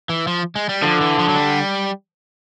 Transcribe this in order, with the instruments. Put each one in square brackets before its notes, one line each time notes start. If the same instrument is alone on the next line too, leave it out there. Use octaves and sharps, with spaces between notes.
[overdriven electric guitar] E3
F3
G#3
G3
[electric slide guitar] D3 [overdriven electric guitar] F3
[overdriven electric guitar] E3
F3
F#3
G3